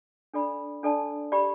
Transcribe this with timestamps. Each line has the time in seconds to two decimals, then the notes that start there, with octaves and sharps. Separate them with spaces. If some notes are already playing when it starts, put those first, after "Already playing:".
0.34 D4 A4 D5 B5
0.83 D4 A4 D5 A5
1.32 G4 D5 B5